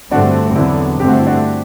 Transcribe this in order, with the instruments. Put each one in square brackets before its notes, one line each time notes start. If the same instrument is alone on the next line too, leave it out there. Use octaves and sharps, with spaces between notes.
[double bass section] G2 D3 A3 C4 [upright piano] D4 F#4
[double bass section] E2 D3 F#3 B3 [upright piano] C4 E4
[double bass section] G2 D3 A3 C4 [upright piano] G4
[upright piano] F#4
E4
D4 F#4